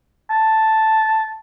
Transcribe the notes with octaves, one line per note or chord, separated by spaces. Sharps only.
A5